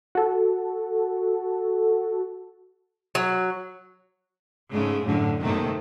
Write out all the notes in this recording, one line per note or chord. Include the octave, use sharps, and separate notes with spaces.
F#4 A4
F#3
G#2 C#3 G#3 A3
F#2 A2 D3
C3 D#3 A3